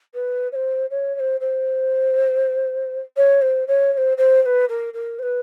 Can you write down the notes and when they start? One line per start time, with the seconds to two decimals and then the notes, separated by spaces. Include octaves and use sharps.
0.14 B4
0.52 C#5
0.55 C5
0.90 C#5
1.15 C#5
1.20 C5
1.40 C5
3.17 C#5
3.42 C5
3.67 C#5
3.93 C#5
3.97 C5
4.17 C5
4.42 C5
4.46 B4
4.69 A#4
4.93 A#4
5.19 C5
5.23 B4